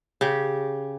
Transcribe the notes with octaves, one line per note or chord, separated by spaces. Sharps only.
C#3 G4